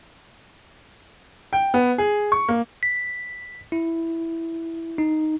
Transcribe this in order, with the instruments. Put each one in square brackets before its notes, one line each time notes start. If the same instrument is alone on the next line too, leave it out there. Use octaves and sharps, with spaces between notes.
[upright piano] G5
B3
G#4
C#6
A#3
[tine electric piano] B6
E4
D#4